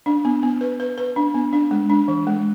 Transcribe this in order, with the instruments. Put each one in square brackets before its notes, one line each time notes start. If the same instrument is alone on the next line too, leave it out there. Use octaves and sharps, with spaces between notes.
[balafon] D4
B3
B3
B4
B4
B4
D4
B3
D4
G#3
D4
E3
G#3